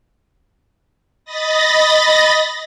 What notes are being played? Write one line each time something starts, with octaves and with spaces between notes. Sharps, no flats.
D#5 B5 D#6 A6 A#6